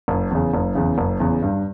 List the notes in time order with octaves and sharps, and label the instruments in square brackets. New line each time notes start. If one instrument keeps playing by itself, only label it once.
[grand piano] F#1
E2 C#3
F#1
E2 C#3
F#1
E2 C#3
G2